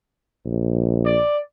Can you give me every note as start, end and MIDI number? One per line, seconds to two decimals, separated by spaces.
0.45 1.18 34
1.05 1.38 74